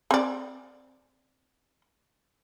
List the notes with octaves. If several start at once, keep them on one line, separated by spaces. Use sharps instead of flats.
C4 D5